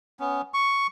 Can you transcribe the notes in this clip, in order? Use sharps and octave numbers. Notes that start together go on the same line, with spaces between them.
B3 C#4
C#6